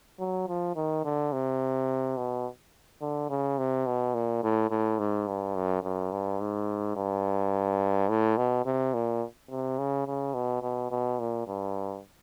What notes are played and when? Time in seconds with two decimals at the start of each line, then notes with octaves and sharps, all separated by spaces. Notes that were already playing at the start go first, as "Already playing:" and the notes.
0.19 F#3
0.48 F3
0.76 D#3
1.04 D3
1.32 C3
2.17 B2
3.01 D3
3.30 C#3
3.58 C3
3.86 B2
4.14 A#2
4.43 A2
4.70 A2
4.99 G#2
5.28 G2
5.55 F#2
5.83 F#2
6.12 G2
6.40 G#2
6.96 G2
8.09 A2
8.37 B2
8.65 C3
8.94 A#2
9.50 C3
9.79 C#3
10.07 C#3
10.34 B2
10.62 B2
10.91 B2
11.19 A#2
11.47 G2